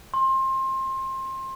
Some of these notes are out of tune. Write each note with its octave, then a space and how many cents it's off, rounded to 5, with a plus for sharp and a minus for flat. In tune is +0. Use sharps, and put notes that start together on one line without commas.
C6 +25